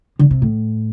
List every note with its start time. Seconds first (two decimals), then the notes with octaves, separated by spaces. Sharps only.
0.19 D3
0.31 C3
0.42 A2